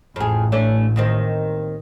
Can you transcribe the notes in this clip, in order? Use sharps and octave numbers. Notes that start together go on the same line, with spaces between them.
A1 F2 G#4
A3 C#4 D4
D#2 D#3 C4